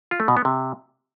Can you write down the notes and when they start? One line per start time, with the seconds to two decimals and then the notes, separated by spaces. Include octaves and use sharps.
0.11 F4
0.20 A3
0.28 B2
0.37 B3
0.45 C3